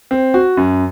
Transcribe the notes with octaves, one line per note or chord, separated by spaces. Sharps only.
C4
F#4
F#2